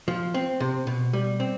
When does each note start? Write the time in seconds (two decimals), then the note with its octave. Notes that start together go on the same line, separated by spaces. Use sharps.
0.08 F3
0.34 C4
0.60 C3
0.87 B2
1.13 G3
1.40 C4